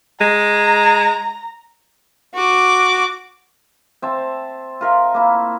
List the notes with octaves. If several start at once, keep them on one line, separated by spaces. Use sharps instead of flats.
G#3 A#5
F#4 D6
C4 E5 A5
F4 A#4 E5
A#3 E4